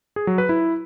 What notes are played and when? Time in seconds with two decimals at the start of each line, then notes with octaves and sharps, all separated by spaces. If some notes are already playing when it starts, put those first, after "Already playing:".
0.16 G#4
0.27 F#3
0.38 B4
0.49 E4